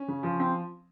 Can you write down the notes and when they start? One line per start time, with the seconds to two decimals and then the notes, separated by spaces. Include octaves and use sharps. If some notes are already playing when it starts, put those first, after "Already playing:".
Already playing: C#4
0.08 C#3
0.23 F3
0.40 C4